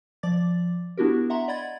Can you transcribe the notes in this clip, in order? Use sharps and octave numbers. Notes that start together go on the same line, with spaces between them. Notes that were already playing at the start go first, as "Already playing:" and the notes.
F3 D5 D6 A6
B3 D4 E4 F#4 G4 A#4
E5 F#5 A#5 C6
D5 D#5 F#5 B5 G#6 A6